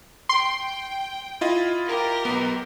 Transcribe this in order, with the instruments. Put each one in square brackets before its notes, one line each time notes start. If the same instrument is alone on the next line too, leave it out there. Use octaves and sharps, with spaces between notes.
[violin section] G5 [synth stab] C6
[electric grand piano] E4 F4 D#5
[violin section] G4 A#4
[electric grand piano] B1 B3